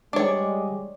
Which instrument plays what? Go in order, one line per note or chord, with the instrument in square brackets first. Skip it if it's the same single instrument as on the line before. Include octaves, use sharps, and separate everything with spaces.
[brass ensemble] G3 G#3 [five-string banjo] D4 C#5 [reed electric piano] D6